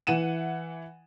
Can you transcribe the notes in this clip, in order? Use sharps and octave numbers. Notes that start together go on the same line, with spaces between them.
E3 F#5 D#7 E7